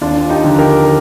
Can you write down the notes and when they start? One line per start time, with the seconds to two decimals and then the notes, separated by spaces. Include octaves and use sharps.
0.01 D#2 D4 F4
0.29 D#4 G4
0.44 D3 F3
0.59 G4 A#4